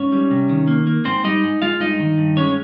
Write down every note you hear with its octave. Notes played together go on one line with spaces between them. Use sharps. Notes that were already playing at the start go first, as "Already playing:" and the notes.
Already playing: G#2 C#4 C#5
G3
C3
D#3
A#3
A#3
G#2 C4 C5
G3 D#4 D#5
G#2
G#3 F4 F5
G2 D#4 D#5
D#3
G2
G#3 C#4 C#5